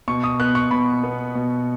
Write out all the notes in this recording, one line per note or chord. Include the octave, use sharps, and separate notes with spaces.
B2 C#6
D#6
B3 F#6
C#6
B2 B5
B3
B2